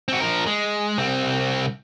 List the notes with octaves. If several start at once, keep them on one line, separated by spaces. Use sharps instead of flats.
C4 F#4
F3 A#4
G#3
C2 C4